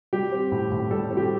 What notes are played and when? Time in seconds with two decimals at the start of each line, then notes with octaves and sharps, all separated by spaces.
0.13 G3 G4
0.32 C4
0.52 A2
0.71 A2
0.90 G3 A4
1.10 C4
1.17 G4